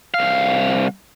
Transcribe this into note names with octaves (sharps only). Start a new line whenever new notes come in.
C2 F5